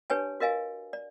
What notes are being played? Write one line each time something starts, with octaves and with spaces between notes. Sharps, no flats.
D4 G4 B4 C#5 G#5 A5
F#4 A#4 D#5 F5 G#5
D5